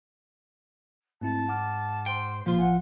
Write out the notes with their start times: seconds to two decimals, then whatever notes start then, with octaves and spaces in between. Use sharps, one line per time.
1.21 G#2 A3 C4 E4 A5
1.49 F#5 D6 F6
2.06 C5 G5
2.46 A1 A#2 F3 A#3 F4 C5
2.59 A1 F#5 G#5